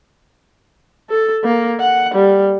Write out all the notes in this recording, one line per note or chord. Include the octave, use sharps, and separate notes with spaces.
A4
A#3
F#5
G3